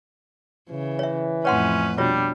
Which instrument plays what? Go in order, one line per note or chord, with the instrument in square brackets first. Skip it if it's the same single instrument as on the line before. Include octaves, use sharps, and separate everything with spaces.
[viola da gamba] C#3 [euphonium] E3
[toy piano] C#5 E5
[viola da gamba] F2 A2 B4 [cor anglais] C#4 [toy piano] C#5 F#5 C6
[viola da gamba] B2 D4 [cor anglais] G3 [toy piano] F4 F#4 C#5